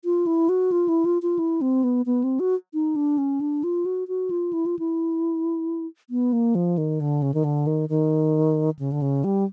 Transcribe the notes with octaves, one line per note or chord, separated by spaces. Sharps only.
F4
E4
F#4
F4
E4
F4
F4
E4
C4
B3
B3
C4
F#4
D#4
D4
C#4
D4
F4
F#4
F#4
F4
E4
F4
E4
B3
A#3
F3
D#3
D3
C#3
D#3
D3
D#3
D#3
C#3
D3
C#3
G3